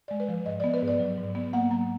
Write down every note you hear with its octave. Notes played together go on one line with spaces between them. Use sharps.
G#3 D5
B4
F3
G#2 D#5
B3 D5
B4
G#2
D5
F#3
G#2
B3
A#3 F#5
F#3 A#5